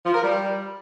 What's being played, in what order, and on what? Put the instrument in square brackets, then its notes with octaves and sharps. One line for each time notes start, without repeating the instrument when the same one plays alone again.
[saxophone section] F3
A#4
G3